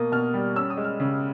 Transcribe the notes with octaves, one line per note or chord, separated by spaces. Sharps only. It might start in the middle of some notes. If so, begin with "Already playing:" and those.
Already playing: B2 A#3 D#6
B2 F6
G3
C#4 E6
D#6
G#3
F6
C#3